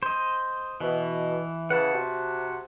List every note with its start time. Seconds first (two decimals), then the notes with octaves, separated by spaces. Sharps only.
0.03 C5 D#5
0.80 B2 E3
1.70 C#3 E3 F#5 A5
1.94 C3 F#4